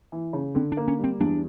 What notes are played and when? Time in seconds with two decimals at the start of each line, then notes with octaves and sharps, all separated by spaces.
0.12 E3
0.33 C#3
0.55 D3 C4
0.72 D4
0.77 A#3
0.88 C#4
0.99 G3 C4
1.20 E2 D4